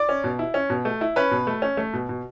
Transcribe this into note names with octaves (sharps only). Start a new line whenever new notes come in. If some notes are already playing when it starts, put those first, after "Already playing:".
Already playing: D5 D6
C#4
B2
E4
C#4
B2
A3
E4
C#4 B4 B5
B2
A3
C#4
A3
B2
B2